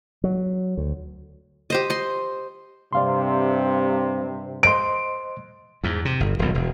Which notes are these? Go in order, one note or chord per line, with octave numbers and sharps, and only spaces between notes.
F#3
D2
G4 C5 D#5
D#5 C6
G2 C3 D5 F5 C6
C5 D#5 C6 D7
E2 G#2
C3
G1
D#1 B1
E1